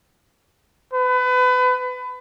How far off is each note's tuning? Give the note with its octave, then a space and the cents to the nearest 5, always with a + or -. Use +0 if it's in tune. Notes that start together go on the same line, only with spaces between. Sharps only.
B4 +30